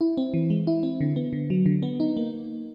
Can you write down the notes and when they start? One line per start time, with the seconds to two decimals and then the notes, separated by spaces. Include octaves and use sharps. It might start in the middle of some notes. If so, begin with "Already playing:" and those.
0.01 E4
0.17 C4
0.34 E3
0.50 G#3
0.67 E4
0.83 C4
1.01 D3
1.16 B3
1.33 D3
1.50 F#3
1.66 D3
1.83 B3
2.00 D#4
2.17 A#3